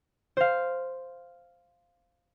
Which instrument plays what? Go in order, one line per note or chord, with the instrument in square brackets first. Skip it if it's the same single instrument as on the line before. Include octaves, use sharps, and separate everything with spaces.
[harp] C5 F5